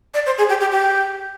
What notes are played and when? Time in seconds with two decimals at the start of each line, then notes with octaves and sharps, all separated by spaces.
0.14 D5
0.26 C5
0.38 G#4
0.49 G4
0.60 G4
0.72 G4